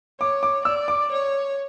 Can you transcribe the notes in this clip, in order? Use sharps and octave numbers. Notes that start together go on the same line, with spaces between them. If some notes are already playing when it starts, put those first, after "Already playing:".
C#5 D6
D6
D5 E6
D6
C#5